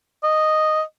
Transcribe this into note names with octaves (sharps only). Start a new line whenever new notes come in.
D#5